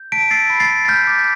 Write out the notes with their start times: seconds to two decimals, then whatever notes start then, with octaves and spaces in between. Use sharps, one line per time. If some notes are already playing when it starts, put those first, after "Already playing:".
Already playing: G6
0.12 A5 B6 D7
0.31 E6 A6 C7
0.50 B5
0.60 A6 C7
0.69 B5
0.85 A6
0.88 F6 G6 B6
1.07 D6